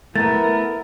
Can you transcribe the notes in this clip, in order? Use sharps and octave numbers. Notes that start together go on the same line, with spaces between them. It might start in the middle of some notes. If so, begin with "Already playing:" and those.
A3 B3 E4 A#4 A6